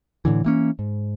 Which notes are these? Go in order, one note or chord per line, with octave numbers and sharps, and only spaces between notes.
A2 D3 E3
E3 A#3 C#4
G#2